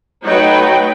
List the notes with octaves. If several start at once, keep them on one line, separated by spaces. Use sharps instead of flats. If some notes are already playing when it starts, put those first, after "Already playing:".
F#3 A3 D#4 F#4 B4 G5